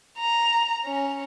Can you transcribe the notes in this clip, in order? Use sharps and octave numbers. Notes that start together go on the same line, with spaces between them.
A#5
C#4